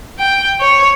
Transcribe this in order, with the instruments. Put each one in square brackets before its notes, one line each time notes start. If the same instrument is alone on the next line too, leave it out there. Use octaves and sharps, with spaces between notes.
[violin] G5
C#5